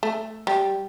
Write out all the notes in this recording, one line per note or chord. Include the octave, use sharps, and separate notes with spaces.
A3
G3